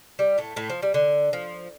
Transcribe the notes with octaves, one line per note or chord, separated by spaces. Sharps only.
G3
A2 A3
A2 A3
F3
G3
D3
F3